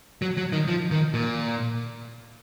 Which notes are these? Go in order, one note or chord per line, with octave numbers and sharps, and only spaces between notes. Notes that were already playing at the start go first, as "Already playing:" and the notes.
F#3
F#3
D#3
F3
D#3
A#2